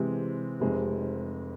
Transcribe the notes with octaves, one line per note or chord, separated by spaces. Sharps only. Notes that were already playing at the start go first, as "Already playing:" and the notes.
Already playing: C3 E3 G#3 C4
F1 F2 C3 G#3